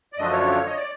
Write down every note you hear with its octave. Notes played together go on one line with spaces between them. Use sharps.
D5
F#2 D3 F3 A3 D4 D#5
C#5
D#5
D5